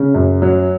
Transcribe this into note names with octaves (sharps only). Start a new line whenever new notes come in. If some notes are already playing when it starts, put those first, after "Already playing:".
Already playing: C#3
F#2
F#3